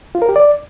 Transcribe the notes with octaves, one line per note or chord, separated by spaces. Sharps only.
F4
A#4
G4
D5